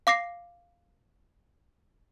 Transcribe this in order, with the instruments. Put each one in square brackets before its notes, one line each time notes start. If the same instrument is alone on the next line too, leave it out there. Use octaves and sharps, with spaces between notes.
[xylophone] F5 D6 A#6 C7